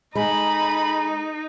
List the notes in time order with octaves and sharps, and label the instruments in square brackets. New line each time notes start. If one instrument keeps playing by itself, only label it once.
[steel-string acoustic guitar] G#3 [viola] D#4 [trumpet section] A4 A#5 [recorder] B5